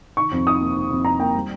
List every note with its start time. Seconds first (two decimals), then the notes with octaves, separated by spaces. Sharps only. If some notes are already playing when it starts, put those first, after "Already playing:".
0.17 D#3 C#6
0.32 F2
0.46 D#4 D#6
0.61 A#3
0.76 D#3
0.90 F2
1.05 D#4 A#5
1.19 A#3 G5
1.34 G3